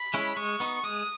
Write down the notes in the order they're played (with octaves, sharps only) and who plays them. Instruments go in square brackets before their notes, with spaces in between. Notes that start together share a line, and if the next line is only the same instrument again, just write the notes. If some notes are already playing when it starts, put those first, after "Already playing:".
Already playing: [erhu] B5
[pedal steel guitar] G#3 C#4 E4
[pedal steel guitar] G#3 [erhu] C#6
[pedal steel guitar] B3 D#4
[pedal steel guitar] G#3 [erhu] D#6